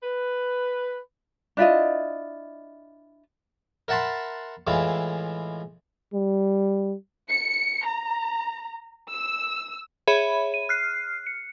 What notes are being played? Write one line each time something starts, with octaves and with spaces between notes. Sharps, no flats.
B4
D4 E4 F4 D#5
A#4 E5 F#5 A5 B5 C6
A2 E3 G#3 E4 F4
G3
C#7
A#5
E6
G#4 C#5 E5 B5
D#7
F6 F#6 C7
C#7